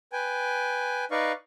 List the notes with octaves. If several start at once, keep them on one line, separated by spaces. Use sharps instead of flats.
B4 G5 G#5
D#4 B4 D5 F5 C#6